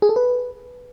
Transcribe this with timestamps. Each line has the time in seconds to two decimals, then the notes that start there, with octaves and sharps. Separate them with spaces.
0.02 G#4
0.09 A4
0.16 B4